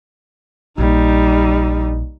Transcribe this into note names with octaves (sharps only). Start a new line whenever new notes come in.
A#1 G3 D#4